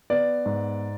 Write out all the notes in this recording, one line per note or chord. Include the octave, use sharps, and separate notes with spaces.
B3 D5
G#2